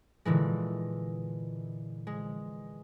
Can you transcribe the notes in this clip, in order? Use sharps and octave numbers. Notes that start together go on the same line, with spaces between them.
A#2 D3 E3 G#3
G#3